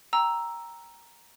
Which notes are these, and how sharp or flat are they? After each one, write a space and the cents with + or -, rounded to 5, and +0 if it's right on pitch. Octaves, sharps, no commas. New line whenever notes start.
G5 +0 A#5 +5 E6 +0